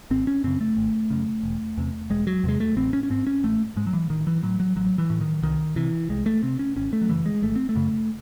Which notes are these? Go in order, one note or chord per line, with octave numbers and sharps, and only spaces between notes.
G#1 C4
C#4
F#2 C#3 C4
A3
G#1
F#2 C#3
E1
E2 C3
E1 G#3
F#3
E2 C3 G#3
A3
A1 C4
C#4
C#4
G#2 C4
C#4
A1 A3
G#2 G#3
F#3
E3
A1 D#3
E3
A2 F#3
F#3
A1 F#3
E3
A2
D#3
C2 D#3
C3 E3
C2 G#3
A3
C3 C4
C#4
G#1 C#4
A3
F#3
F#2 C#3 E3
G#3
G#1 A3
C4
A3
F#2 C#3